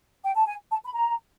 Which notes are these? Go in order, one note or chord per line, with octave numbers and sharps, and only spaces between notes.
G5
A5
G#5
A5
B5
A#5